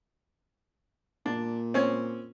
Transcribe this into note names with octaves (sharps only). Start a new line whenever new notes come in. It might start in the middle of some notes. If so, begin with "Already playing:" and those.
A#2 D4
C4 C#4 C#5